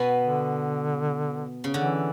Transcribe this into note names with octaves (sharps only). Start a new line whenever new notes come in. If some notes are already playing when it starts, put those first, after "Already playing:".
Already playing: B2 B3
D3
C#3
D3 E3